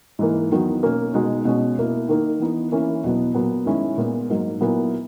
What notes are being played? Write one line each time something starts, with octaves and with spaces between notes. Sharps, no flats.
G#2 E3 A#3
E2 D#3 F#3 B3 F#4
B2 A#3 C#4
B2 G#3 D#4 F#4
B2 G#3 C#4 F#4
B2 A#3 E4
D#3 A#3 D#4
E3 B3 D#4
E3 A#3 C#4 E4
E2 B2 F#3 B3
A#2 F#3 B3
D#3 G#3 C#4 E4
A#2 G#3 B3
G#2 F#3 A#3
A#2 F#3 B3 E4